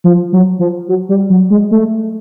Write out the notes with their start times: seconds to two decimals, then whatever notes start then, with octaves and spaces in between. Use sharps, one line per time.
0.04 F3
0.33 F#3
0.59 F3
0.88 F#3
1.09 G3
1.30 F#3
1.50 G#3
1.71 A3